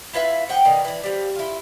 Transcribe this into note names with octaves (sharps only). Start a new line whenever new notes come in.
E4 F4 B4 E5
F3 F#5 G5
B2 D#3 D4
E3 D4
F3 G3
E4 F4